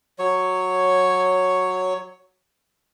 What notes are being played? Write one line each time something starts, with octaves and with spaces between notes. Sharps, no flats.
F#3 C#5